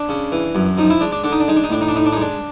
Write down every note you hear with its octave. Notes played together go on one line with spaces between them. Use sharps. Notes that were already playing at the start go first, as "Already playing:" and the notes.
Already playing: D4
C#3
E3
F#2
F3 D#4
E4
G#3 D4
D4
D3 D4
D#4
D4
G#3 D#4
D4
D#4
A2 D4
D#4
D4
A2 D#4
D4
D#4
G#3
D4